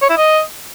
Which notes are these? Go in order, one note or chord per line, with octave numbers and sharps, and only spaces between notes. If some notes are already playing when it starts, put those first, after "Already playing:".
C#5
E4
D#5